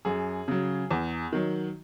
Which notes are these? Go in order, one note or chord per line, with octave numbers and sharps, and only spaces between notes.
F#2 G#4
C#3 F#3
E2
D#3 F#3